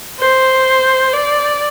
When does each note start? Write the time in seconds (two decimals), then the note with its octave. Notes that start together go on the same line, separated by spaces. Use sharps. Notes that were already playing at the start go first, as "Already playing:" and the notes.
0.19 C5
1.14 D5